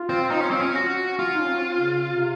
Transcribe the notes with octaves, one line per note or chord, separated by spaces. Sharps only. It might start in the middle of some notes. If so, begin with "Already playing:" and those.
Already playing: F4
C4
D#4
C#4
C4
C#4
F#4
F4
D#4
C#4
C4
C#3
C3